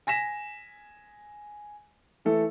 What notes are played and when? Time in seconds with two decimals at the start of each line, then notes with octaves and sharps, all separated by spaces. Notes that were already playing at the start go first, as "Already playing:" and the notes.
0.07 G#5 A#6 B6 E7
2.25 E3 A3 A4